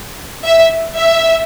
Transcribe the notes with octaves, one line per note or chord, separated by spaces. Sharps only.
E5
E5